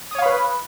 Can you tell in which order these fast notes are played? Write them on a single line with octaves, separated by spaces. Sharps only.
D#6 C#5 F5 B5 B4